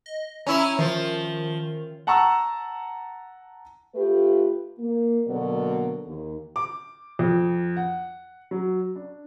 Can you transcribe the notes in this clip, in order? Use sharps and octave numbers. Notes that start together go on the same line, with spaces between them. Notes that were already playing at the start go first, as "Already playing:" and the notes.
D#5
C#4 E4 A#5
D#3 F3
F#5 A5 A#5 C#6 E6
A3 F4 G4 B4
A#3
B2 D3 F#3 A#3 D5
D#2
D6
F2
F#5
F#3
D4